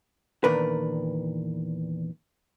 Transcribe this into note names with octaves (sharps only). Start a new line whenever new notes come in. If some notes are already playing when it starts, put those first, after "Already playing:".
E2 A#2 D#3 D4 A#4 B4